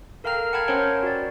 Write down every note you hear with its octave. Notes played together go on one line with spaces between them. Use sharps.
A4 A#4 F5 G5 A#5 F6
F#5 G5 A5 B5 F6 G#6
C#4 A#4 C5 C#5 G5 A#5
F#4 D5